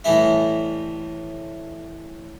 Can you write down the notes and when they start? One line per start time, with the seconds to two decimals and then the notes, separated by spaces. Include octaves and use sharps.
0.04 A2 E3 G3 E4